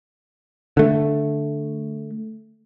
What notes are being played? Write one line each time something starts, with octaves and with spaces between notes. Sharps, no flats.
D3 A3